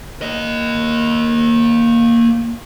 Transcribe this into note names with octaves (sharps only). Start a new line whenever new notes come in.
A#3 D#5